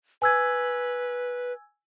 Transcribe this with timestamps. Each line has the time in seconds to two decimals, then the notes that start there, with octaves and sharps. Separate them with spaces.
0.22 B4 G#5 E6 G#6